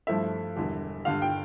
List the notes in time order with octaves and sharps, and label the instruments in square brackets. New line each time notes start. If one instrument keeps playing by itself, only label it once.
[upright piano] G2 F3 A3 E4 E5
E1 E2 D3 G3
G2 D3 G3 F5
G5